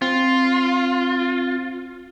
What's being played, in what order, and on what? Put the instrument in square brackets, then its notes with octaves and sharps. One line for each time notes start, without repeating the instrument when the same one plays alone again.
[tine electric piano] C4 [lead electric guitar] F4